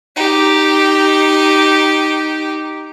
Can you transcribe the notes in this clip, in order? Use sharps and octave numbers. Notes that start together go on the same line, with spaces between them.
D#4 G4